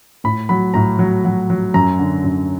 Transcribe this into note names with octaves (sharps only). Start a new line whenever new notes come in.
A2 B5
F#3 B5
A2 A#5
F#3
F#3
F#3
F#2 A#5
D3
F#2